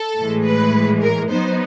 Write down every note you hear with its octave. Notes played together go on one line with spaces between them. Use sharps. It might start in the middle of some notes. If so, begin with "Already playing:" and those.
Already playing: A4
A2 E3 G#3
B4
A#4
F#3 B3 D#4 C5